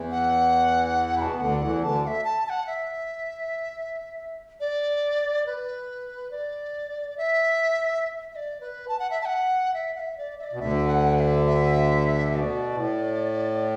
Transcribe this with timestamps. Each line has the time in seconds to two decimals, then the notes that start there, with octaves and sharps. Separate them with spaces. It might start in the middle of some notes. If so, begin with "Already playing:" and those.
Already playing: E2 E3
0.11 F#5
1.17 B2 B5
1.22 A5
1.38 D2 D3 F#5
1.60 E2 E3 F#5
1.82 D2 D3 A5
2.04 F#5
2.07 E5
2.24 A5
2.46 A5
2.50 F#5
2.67 E5
4.60 D5
5.46 B4
6.31 D5
7.17 E5
8.32 E5
8.36 D5
8.61 B4
8.88 A5
8.99 F#5
9.11 E5
9.21 A5
9.25 F#5
9.74 E5
9.95 F#5
9.99 E5
10.18 D5
10.39 E5
10.44 D5
10.53 B2
10.60 D2 D3 E5
10.88 F#5
11.17 F#5
11.20 E5
11.45 E5
12.31 B2 E5
12.36 D5
12.74 A2